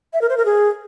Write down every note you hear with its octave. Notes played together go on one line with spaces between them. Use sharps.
E5
A#4
C5
A#4
G#4